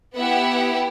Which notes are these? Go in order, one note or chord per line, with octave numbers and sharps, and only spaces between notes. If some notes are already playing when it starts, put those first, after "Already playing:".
B3 E4 G4 E5 F#5